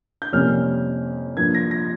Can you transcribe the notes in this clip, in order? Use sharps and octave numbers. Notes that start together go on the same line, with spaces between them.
G6
F2 C3 G3 A#3 C#4 F6
G2 F3 A#3 G#6
A#6
A#6